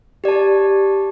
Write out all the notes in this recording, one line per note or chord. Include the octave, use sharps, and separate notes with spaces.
G4 D5 A5